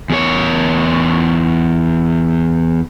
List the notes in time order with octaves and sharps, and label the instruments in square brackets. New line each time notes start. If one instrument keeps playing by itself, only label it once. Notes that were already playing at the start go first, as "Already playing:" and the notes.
[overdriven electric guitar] E2 C#5